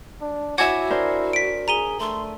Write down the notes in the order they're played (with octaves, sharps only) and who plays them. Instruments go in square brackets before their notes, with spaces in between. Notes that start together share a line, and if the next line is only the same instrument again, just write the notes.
[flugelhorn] D4
[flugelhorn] E4 [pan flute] F#4 [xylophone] C#5 F#5 G#6 [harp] E5 G#5 D6
[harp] D4 A#4 C5
[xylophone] B6 D7
[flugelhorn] G#4 [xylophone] A#5 D#7 G7
[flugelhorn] A3 [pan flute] C6